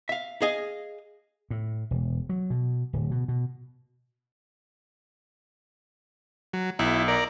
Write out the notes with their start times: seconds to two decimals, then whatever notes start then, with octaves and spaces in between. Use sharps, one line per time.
0.09 E5 F5
0.42 G#4 D#5 F5 G#5
1.50 A2
1.91 E1
2.29 F#3
2.50 B2
2.93 D1
3.11 B2
3.28 B2
6.53 F#3
6.79 B1 E4
7.08 A#4 D5